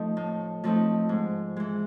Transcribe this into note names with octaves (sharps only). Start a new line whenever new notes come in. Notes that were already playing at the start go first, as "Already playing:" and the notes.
Already playing: F3 A3 C4 D#4
A2
F3 A3 C4 D#4
G#2
E3 G#3